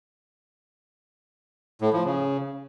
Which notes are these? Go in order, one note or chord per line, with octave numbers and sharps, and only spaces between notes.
A2
F3
C#3